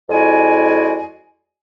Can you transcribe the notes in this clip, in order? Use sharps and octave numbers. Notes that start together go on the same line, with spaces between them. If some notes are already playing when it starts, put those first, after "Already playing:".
F2 G#3 E4 F#4 D5 G#5